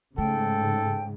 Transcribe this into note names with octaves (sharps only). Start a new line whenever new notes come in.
G#2 C#3 A3 A4 G5